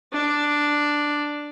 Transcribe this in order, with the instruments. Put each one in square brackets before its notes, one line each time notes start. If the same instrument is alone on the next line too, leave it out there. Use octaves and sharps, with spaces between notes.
[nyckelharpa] D4